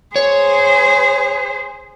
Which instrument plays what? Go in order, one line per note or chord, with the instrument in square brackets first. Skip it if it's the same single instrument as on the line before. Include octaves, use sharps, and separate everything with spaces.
[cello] G#4 C5 [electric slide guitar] C#5